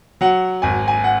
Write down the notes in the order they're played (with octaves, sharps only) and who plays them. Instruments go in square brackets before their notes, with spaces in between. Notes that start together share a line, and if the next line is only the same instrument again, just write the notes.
[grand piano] F#3 F#5
G#1 G#5
G#5
F#5